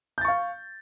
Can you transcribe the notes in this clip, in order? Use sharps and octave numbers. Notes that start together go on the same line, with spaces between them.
F5 C#6 G6 A6